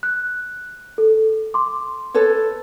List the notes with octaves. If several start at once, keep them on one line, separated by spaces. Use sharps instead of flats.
F#6
A4
C6 D6
A4 B4 C#5